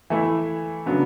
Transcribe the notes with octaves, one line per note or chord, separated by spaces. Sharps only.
E3 A3 E4
C#3 F#3 B3 D4